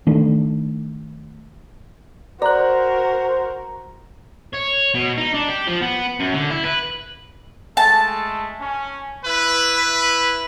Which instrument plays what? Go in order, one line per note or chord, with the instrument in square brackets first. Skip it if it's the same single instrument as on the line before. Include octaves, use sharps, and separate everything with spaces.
[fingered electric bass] D#3 A3 D4
[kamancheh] F#4 A#4 [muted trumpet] C5 [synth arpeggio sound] D5 F#6 [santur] A#5
[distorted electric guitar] C#5
B2
D#4
D4
G4
F3
B3
F#2
D3
E4
B4
[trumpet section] G#3 A3 A4 [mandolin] A5
[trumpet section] C#4
E4 B4